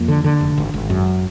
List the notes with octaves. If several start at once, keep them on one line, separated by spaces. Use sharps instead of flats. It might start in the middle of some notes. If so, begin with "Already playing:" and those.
Already playing: F2 A#3
D3
D3
F1
G#1
G#1
F#2